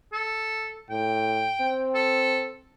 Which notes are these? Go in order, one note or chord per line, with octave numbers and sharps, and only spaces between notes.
A4
A2 G5
C4
A4